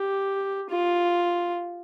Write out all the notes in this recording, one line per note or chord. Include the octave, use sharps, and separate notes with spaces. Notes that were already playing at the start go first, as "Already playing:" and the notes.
Already playing: G4
F4